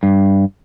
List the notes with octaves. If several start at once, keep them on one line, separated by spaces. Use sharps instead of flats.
G2